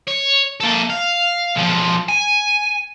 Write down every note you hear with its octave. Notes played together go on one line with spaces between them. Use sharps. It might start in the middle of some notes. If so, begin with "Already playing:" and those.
C#5
A#3 A4
F5
B1 F3
G#5